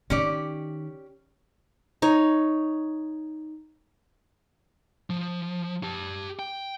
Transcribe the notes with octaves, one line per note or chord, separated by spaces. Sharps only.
D#3 C#4 G4 D5
D#4 C#5
F3
G4 A5
G5